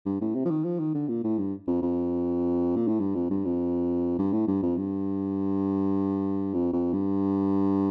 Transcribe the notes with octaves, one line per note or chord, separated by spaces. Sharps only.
G2
A2
C3
F3
D#3
F3
D#3
D3
A#2
A2
G2
F2
F2
A#2
A2
G2
F2
G2
F2
G2
A2
G2
F2
G2
F2
F2
G2